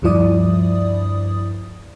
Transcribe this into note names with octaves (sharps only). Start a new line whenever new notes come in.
D2 G2 F3 E4 D5 D#6